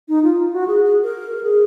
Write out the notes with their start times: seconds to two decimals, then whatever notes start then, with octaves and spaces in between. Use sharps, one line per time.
0.09 D#4
0.23 F4
0.53 F#4
0.68 G#4
0.84 G#4
1.03 A#4
1.37 A#4
1.43 G#4